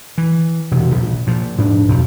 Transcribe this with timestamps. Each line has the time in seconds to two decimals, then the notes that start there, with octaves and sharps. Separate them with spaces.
0.18 E3
0.71 E1 C3
0.94 A#1
1.27 A#2 F3
1.58 G#2 D4
1.88 B1 F2 F3